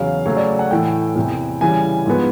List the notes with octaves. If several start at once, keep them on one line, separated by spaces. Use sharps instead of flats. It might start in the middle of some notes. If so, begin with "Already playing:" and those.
Already playing: E2 C#3 F#3 F5
C#3 F#3 A3 C#5
D5
F#5
A2 E3 A3 G5
E2 C3 E3
C#3 E3 G3 G#5
G#2 F3 G#3 B3